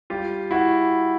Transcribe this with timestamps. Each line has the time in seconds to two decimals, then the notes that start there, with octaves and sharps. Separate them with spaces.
0.10 G3 F4 G4
0.51 E4 F#4